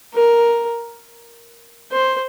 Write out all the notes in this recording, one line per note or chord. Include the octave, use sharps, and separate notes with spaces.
A#4
C5